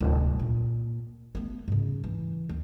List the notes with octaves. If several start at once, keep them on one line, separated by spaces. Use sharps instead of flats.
D1 C2
A#2
A3 B3
G#2 C#3
E3
D#2